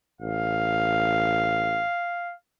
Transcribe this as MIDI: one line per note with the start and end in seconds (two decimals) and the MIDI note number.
0.21 1.82 33
0.21 2.34 77